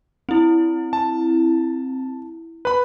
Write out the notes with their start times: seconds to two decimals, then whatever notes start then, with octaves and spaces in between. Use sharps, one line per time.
0.29 C4 E4
0.93 A5
2.65 B4 B5